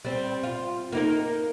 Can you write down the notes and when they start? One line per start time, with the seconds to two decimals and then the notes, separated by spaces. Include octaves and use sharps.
0.05 G3 C4
0.43 F4
0.92 A#3 D#4 A#4